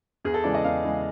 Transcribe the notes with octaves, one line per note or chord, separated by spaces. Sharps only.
E2 G#4
A4
C#3 E3 G#3 D5
D#5
E2 F5
C#3 E3 G#3